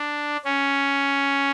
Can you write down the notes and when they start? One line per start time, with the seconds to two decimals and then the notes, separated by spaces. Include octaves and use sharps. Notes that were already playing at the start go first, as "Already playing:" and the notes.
Already playing: D4
0.45 C#4